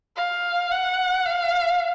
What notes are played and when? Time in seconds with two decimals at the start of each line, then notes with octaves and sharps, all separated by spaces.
0.16 F5
0.71 F#5
1.26 F5